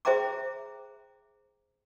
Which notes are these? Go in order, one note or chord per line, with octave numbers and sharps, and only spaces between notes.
G#4 C5 E5 G5 A#5 D6